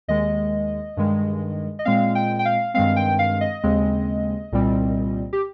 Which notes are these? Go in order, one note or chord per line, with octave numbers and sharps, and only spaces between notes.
D#2 D#3 G#3 D#5
G2 D#3 G#3
D#5
A#2 G#3 C4 F5
G5
G5
F5
G2 D#3 G#3 C4 F5
G5
F5
D#5
D#2 C#3 G#3 C4
C2 A#2 G3 C4
G4